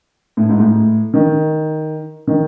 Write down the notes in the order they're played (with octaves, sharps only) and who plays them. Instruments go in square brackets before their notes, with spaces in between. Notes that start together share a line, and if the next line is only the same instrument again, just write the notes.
[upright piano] A2
G#2
A2
D#3
D#3